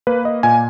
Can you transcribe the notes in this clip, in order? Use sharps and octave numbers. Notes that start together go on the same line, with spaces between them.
A#3 B4
D#5
A#2 G#5